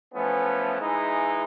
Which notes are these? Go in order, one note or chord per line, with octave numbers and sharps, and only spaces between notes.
E3 F3 A3 B3 C#4
E3 G#3 D#4 E4